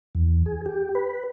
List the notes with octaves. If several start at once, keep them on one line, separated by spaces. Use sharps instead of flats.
E2
G#4
G4
B4